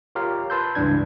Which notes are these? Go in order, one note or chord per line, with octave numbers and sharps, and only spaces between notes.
F4 G4 A#4 C#5 F5
B4 A5 C6 E6 G6
C#2 G2 E3 D4 G#6